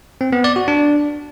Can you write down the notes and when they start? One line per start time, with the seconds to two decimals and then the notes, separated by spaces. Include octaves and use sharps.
0.21 C4
0.33 B3
0.44 D5
0.56 F#4
0.68 D4